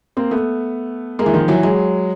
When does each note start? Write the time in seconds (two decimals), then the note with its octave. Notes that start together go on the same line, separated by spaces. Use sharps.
0.17 A#3 C4
0.31 A3 B3
1.19 G#3 A#3
1.26 E3
1.34 D#3 F3
1.48 E3 F#3
1.63 F#3 G#3